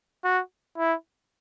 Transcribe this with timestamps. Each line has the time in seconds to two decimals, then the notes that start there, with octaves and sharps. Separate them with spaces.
0.24 F#4
0.78 E4